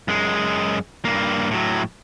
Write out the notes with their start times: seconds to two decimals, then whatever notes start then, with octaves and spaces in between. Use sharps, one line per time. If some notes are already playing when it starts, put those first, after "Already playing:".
0.08 F#2 G#3
1.05 G2 A#3
1.51 A2 F#3